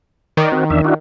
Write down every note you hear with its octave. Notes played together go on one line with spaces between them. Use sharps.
D#3 D5
C4 F#4
E2 D4 E5
D4 E4 F#4